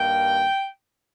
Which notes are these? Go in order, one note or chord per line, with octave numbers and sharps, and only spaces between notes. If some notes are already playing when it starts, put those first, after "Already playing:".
Already playing: G2 D#3 A#3 G5